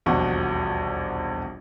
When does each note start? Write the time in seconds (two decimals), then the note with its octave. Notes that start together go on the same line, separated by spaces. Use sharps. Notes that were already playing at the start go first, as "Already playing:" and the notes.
0.06 D#1 A#1 E2 B2 F#4 C#6